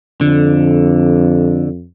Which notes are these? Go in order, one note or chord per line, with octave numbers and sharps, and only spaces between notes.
F2 D3